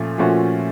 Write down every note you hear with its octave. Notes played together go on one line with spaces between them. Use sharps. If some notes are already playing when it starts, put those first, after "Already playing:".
Already playing: A#2 F3 A3 C#4
A#2 F3 A3 C#4 F#4